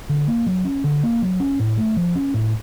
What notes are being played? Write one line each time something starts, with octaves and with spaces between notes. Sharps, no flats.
D3
A#3
F#3
C#4
D3
A#3
F#3
C#4
A2
A3
F3
C#4
A2